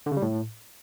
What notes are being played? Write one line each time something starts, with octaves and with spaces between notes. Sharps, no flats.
D3
C#3
G3
A2